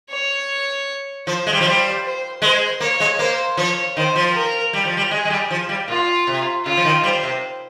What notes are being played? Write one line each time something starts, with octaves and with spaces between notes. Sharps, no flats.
C#5
F3 C5
G#3
G3
F3
G3 C5
C5
G#3 C5
A#3 C#5
G#3
A#3 C5
F3 C#5
D#3 C5
F3
A#4
G3
F3
G3
G#3 G#4
G#3
G3
F3
G3
A#2 F4
C3
C#3 F4
F3
D#3
G3 C5
C3